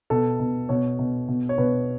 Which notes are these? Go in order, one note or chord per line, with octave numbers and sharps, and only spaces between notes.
B2 A4
B2
B2 C#5
B2
B2
C#5
B2 B4